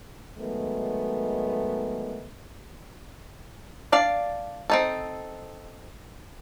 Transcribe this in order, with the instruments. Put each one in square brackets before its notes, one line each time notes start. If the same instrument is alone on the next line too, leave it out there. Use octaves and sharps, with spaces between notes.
[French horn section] D#3 F#3 G#3 A3 B3
[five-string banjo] D4 D5 F5
C4 D#4 A4